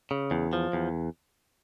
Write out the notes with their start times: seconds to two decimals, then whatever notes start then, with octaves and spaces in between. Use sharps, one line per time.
0.11 C#3
0.31 E2
0.53 F3
0.73 E2